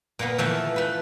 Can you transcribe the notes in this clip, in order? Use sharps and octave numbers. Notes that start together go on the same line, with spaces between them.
A#2 A#3 B3
E3 F3 A3
A3 B4